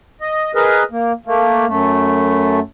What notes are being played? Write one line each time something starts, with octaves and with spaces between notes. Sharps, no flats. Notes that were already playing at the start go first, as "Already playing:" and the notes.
D#5
G#4 A#4 B4 D#5
A#3
A3 A#3
F#2 A3